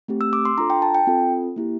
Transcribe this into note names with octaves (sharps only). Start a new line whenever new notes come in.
A3 C4 G4
E6
D6
C6
D4 F4 A4 A#5
G5
A5
G5
C4 F4 A4
A#3 E4 G4